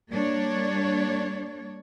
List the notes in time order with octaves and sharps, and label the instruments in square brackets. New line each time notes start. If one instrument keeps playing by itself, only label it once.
[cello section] G3 A#3 D4 C#5